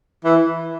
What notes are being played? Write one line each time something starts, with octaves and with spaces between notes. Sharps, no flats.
E3